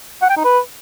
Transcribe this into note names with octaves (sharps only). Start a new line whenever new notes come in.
F#5
G5
D#4
B4